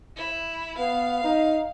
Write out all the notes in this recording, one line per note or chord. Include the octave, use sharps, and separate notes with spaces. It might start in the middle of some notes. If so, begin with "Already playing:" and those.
E4
B3 F5
D#4